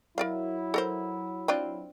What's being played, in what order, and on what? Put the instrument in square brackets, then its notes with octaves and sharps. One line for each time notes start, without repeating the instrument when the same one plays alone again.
[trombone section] F#3 E4 [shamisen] A#4 D5 F5
[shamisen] A4 A#4 C5
C4 D4 F4